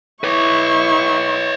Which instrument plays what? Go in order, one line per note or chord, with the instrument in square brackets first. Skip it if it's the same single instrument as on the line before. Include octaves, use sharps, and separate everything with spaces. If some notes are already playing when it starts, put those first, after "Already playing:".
[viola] E4 C#6 [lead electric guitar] B4 C#5